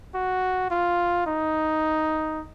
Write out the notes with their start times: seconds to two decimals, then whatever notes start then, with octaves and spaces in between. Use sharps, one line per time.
0.15 F#4
0.71 F4
1.26 D#4